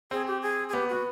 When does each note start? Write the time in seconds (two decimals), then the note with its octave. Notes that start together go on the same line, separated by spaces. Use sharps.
0.11 C4 G#4
0.27 G4
0.42 G#4
0.69 G#4
0.73 B3 G4
0.89 B3 F#4